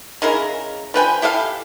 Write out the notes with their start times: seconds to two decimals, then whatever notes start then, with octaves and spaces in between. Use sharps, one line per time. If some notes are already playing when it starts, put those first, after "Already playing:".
0.22 C#3 G#3 E4 A#4
0.94 F3 B4 G5 G#5
1.22 E4 G4 A4 F5